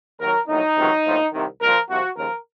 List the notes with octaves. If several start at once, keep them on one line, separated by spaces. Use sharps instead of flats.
D#2 D#3 F#3 A#4
A#1 A2 F#3 D#4
C#2 C3 D#3 F#3
A#1 A2 F3
C2 C3 D#3
C2 A#2 F3 A#4
C2 C3 F3 F#4
D#2 C#3 F3 A#4